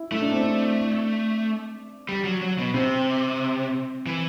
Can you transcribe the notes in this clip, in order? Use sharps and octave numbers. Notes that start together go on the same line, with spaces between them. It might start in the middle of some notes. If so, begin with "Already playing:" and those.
Already playing: E4
A3 E4
D4
C4
D4
G3
F#3
F#3
B2
C3 C4
E3